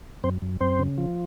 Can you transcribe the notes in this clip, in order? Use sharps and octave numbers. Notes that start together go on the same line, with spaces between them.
F#2 C4 C5
F#2
F#2 C4 C5
C#3
F3